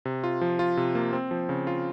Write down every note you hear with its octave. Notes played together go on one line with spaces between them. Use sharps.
C3
F4
F3
F4
C3
A#3
C4
F3
C#3
F4